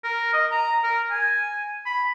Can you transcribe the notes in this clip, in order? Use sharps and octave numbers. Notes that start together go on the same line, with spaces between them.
A#4
D#5
A#5
A#4
G#5
B5